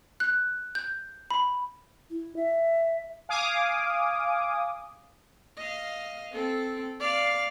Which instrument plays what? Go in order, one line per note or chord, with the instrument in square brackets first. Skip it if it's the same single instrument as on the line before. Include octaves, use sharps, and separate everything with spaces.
[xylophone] F#6
G6
B5
[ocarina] E4
E5
[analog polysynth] F5 G#5 D6 D#6
[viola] D#5 F5
C4 A4
D5 F5